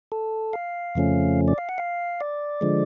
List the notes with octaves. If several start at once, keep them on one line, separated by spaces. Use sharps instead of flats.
A4
F5
F2 C#3 F3 A3 C#4
D5
F5
F#5
F5
D5
D3 F3 G#3